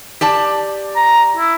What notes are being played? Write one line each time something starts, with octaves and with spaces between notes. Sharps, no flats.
G4 D5 A5
A#5
E4